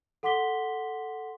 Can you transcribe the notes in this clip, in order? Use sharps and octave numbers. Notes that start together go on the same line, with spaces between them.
A4 F#5 C6 D6 B6 G7